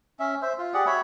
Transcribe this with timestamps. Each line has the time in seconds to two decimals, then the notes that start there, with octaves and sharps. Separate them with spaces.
0.19 C#4 E5
0.42 C5 E5
0.58 F4
0.74 G4 G#4 D5 F#5
0.87 F#4 C#5 E5 B5